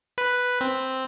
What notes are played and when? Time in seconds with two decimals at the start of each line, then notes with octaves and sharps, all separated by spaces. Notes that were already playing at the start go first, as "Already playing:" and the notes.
0.18 B4
0.61 C4